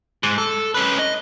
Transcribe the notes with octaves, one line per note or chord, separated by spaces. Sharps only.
G#2
A4
C#4 B4
D#5